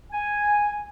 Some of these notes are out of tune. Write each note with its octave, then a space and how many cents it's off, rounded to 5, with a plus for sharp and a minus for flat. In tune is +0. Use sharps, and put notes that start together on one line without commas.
G#5 -5